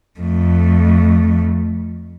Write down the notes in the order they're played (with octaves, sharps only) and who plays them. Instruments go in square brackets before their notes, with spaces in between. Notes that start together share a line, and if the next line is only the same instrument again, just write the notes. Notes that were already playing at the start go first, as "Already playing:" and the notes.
[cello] F2 A3